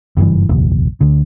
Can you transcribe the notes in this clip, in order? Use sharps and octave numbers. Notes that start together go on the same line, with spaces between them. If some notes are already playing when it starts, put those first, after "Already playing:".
F#1 G2 C3 E3
F1 A#1 D#2
D2 D3